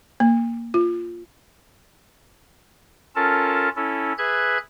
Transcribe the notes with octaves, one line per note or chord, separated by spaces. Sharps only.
A#3
F4
C#4 F4 A4 A#4 A5
C#4 E4 A4
G#4 B4 E5 F#6 G#6